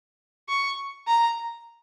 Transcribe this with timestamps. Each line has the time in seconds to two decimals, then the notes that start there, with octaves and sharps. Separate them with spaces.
0.49 C#6
1.08 A#5